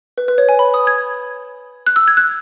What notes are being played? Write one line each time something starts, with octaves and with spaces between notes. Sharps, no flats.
B4
B4
C#5
G#5
B5
D#6
G#6
F#6
E6
G#6
F#6